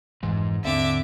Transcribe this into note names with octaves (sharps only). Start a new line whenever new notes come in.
F1 B1 G#2 E3
D#2 G#2 D3 C4 E5 D6